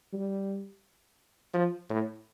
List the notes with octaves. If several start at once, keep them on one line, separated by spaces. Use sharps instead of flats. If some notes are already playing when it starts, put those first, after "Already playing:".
G3
F3
A2